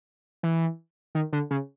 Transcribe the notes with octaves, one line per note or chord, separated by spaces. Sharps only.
E3
D#3
D3
C#3